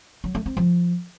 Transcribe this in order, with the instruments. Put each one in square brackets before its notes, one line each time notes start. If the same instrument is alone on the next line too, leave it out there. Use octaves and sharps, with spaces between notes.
[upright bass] F#3
A3
C4
F3